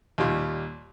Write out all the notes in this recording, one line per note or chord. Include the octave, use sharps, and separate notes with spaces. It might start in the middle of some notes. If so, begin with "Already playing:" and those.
D#2 A#2 G3 F4